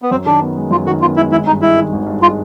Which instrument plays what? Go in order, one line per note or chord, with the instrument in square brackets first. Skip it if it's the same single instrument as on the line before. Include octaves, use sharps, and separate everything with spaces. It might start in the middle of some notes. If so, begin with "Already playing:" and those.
[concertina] B3
[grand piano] F#2 [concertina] C4
[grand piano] D#3 [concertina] D4
[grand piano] B3
G#3
[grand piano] F#2 [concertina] F4
[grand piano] D#3 [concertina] F#4
[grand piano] B3 [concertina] F4
[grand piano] G#3 [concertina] E4
[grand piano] G#1 [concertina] E4
[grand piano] G2 [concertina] D#4
[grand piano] G#3 [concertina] E4
[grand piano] D#3
G#1
G2
[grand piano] G#3 [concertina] F4